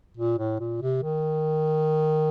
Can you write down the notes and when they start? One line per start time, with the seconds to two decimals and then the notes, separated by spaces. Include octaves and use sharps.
0.17 A#2
0.39 A2
0.60 A#2
0.82 C3
1.03 D#3